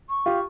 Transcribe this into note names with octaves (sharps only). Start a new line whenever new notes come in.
C#6
F4 G4